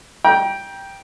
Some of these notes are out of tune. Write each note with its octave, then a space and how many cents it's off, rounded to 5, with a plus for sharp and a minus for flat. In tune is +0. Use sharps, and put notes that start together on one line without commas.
G5 +0 A#5 +35